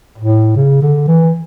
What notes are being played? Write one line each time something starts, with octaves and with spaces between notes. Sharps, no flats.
A2
C#3
D3
E3